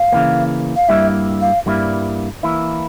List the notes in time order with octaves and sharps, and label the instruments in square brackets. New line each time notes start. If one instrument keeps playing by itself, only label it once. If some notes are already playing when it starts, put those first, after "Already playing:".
Already playing: [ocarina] F5
[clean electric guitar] C#3 E3 A#3
[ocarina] F5
[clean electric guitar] G2 G3 A#3 E4 [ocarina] E5
[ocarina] F5
[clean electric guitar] G2 G3 A#3 E4
E3 A#3 E4